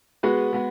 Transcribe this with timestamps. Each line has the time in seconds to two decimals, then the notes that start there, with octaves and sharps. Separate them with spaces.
0.23 G#3 B3 F#4 B4
0.53 G#3 B3